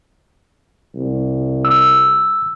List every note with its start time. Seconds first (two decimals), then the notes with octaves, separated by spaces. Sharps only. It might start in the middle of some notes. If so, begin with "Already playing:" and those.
0.95 C2
1.65 E6